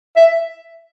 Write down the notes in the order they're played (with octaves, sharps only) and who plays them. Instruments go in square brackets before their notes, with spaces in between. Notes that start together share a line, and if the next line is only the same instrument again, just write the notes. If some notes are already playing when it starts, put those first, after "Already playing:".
[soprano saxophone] E5